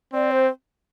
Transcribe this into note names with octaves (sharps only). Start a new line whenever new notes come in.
C4 D5
C5